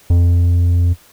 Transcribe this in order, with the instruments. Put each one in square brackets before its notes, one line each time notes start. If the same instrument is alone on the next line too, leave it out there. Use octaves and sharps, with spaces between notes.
[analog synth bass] F2